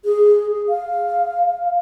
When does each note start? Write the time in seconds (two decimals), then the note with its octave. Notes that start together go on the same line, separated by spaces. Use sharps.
0.04 G#4
0.69 F5